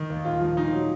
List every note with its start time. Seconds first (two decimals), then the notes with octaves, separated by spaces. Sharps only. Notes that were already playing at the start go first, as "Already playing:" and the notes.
Already playing: D#3
0.10 D#2
0.25 A#2 F4
0.41 F3
0.57 A#2 D#4
0.73 F#3